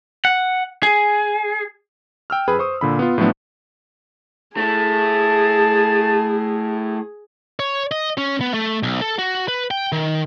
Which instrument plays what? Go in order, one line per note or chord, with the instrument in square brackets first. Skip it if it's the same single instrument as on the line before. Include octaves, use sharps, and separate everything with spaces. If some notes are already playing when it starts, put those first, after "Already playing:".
[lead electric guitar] F#5
G#4
[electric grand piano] G5 E6 F6
F2 G#4 B4 B5
C5 C#6 D#6
A#2 D3 B5
B3 F4
A2 F3 F#3 A3 B3 D4
[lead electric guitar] A3 E4 [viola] G#4 [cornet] A5
[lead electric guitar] C#5
D#5
C#4
B3
A3
B1
A4
F#4
B4
G5
D#3